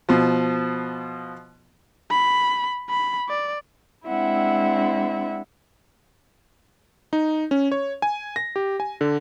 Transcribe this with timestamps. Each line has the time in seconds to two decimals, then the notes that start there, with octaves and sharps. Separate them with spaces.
0.09 B2 F3
2.11 B5
2.89 B5
3.29 D5
4.07 G#3 C4 D4 E4 E5 F#5
7.13 D#4
7.51 C#4
7.72 C#5
8.02 G#5
8.36 A#6
8.56 G4
8.80 G#5
9.01 D3